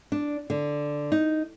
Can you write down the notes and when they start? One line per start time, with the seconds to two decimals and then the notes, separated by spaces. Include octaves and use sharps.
0.12 D4
0.50 D3
1.12 D#4